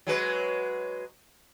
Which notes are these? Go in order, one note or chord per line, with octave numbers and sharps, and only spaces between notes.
F#3 G#3 B4